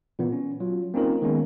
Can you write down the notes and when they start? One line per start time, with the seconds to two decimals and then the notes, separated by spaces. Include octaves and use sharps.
0.19 A#2 E3 A#3 B3
0.32 C#4
0.60 F#3 F4
0.94 A#3 C4 C#4 D#4 F4 A#4
1.22 D#3 G#3 A#3 B3 C#4